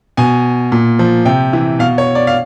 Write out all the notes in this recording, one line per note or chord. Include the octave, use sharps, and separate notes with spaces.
B2 G#5
A#2
F3
C3 G5
E3
B2 F5
C#5
D5
F5